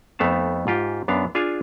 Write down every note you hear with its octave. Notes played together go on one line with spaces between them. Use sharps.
F2 A3 B3 D#4 F5 A5
G#2 F4 G4
F#2 B3 D4 F5
D4 F4 G#4 F5 G#5